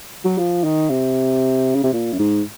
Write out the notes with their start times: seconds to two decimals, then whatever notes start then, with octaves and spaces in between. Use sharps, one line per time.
0.25 F#3
0.38 F3
0.64 D#3
0.90 C3
1.75 C#3
1.84 C3
1.93 A#2
2.13 F#2
2.19 G#2